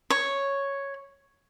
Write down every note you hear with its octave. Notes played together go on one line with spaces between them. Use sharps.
C#5